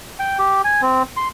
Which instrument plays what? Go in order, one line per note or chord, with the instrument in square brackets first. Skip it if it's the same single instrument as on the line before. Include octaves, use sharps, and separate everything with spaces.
[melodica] G5
G4
G#5
C4
C6